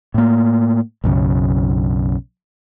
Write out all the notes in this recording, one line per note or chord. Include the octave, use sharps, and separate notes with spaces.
A2 A#3
B1 F#2 C#3